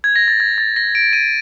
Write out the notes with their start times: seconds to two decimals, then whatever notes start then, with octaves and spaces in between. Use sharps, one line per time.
0.04 G#6
0.16 A#6
0.28 A6
0.40 G#6
0.58 A6
0.76 A#6
0.95 D7
1.13 D#7